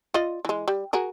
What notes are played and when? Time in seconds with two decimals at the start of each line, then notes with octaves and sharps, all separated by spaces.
0.14 F4 D5 D#5
0.45 E3 G#3
0.68 G3
0.93 F#4 G#4 A#4